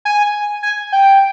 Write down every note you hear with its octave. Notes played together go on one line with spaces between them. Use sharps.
G#5
G#5
G5